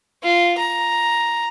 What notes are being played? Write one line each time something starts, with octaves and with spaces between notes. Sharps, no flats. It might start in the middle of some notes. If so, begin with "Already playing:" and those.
F4
A#5